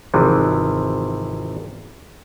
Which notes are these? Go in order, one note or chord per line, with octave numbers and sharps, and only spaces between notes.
G#1 C3 E3 F3